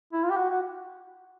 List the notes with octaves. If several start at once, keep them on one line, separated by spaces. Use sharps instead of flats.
E4
F4
G4
F#4
F#4